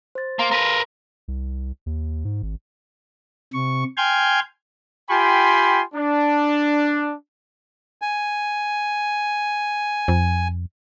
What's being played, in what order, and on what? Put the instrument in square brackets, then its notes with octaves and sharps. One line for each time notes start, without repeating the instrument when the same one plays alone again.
[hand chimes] C5 A6
[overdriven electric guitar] A#3 [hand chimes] F5 C6
[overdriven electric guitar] A#4 B4
[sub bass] C2
D#2
G#2
G#1
[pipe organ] C3 C#6
G5 G#5 C6 F6 G6 G#6
[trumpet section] F4 G4 G5 G#5 B5 C6
D4
[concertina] G#5
[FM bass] F2